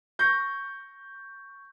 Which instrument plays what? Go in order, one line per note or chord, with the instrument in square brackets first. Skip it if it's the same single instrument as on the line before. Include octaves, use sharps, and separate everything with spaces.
[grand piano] C#6 G6 A#6